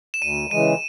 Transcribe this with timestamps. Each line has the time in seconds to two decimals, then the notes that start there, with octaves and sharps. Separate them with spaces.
0.14 E7
0.22 D2 D#7
0.51 C#3 E3 G#3 D#7